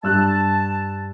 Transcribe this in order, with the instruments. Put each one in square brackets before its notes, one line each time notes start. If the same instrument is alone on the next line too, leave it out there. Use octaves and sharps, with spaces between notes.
[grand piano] G2 E6 F#6 [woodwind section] A5